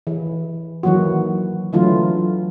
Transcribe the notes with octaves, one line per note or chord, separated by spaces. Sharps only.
E3
D#3 E3 F#3 A#3 F#4
D3 E3 F#3 A3 F4